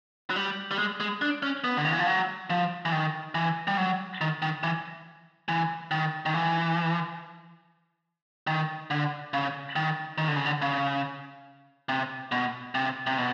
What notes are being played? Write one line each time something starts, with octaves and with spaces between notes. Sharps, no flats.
F#3
G3
G3
G#3
G#3
D4
C#4
B3
D3
D#3
E3
F3
F#3
F3
E3
D#3
E3
G3
F#3
D#3
D#3
E3
E3
D#3
D#3
E3
D#3
D3
C#3
D#3
D#3
D3
C#3
D3
C#3
C3
B2
C3
C3
B2